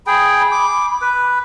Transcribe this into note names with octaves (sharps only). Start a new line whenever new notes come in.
G#4 G5 B5
D6
B4